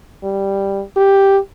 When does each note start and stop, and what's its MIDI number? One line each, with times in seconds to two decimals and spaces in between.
0.24 0.82 55
0.96 1.37 67